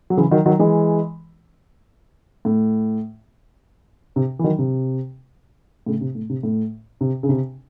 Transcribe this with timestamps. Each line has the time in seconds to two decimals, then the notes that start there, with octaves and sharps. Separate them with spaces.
0.10 F#3
0.17 C#3 E3
0.31 D#3 F#3
0.46 D#3 F#3
0.59 E3 G#3
2.45 A2
4.16 C3
4.39 E3
4.44 D#3 F#3
4.59 C3
5.86 A2 C#3
6.01 C3
6.15 A2
6.30 C3
6.43 A2
7.01 C3
7.23 C#3
7.29 C3